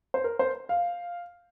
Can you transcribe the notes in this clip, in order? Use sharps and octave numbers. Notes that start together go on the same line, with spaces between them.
C5
A#4
C5
F5